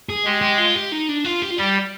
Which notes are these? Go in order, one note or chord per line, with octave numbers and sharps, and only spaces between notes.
G#4
G#3 G4
G4
F4
G4
D#4
D4
F4
G4
F4
G3 G4